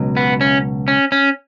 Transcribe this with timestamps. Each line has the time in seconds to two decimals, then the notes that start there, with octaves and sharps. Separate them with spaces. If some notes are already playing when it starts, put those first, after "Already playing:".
Already playing: C#2 B2 F#3
0.17 B3
0.41 C#4
0.88 C#4
1.12 C#4